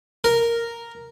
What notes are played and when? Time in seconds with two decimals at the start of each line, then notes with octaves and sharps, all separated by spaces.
0.24 A#4